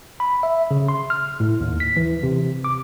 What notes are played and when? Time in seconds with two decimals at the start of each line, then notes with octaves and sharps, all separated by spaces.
0.20 B5
0.43 E5
0.71 C#3
0.88 C6
1.10 F6
1.40 A2
1.60 D#2
1.80 B6
1.97 E3
2.23 C3
2.64 D6